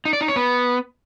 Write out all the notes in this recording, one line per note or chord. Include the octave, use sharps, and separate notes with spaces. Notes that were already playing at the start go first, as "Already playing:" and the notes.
D#4
D5
D#4
C#5
B3